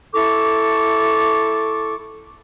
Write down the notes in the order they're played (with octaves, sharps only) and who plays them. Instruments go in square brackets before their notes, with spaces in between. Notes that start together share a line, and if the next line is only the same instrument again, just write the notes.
[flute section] E4 A4 C#6 D6